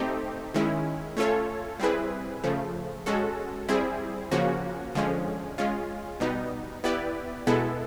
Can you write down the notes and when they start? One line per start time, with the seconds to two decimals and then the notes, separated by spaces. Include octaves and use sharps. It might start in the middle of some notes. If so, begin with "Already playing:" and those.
Already playing: A3 C4 D#4 G4
0.54 D#3 G#3 C#4 E4
1.17 A3 C#4 F4 A4 C#5
1.80 G3 C4 E4 G#4 B4
2.44 C#3 F3 A3
3.06 G#3 C#4 F#4 A4
3.68 G3 C4 E4 G#4
4.31 C#3 F3 A#3 C#4 F#4
4.95 D3 F3 G#3 C#4
5.58 G#3 C#4 F4
6.20 B2 G3 B3 D#4
6.84 B3 E4 G4 B4 D5
7.47 B2 G#3 B3 E4 A4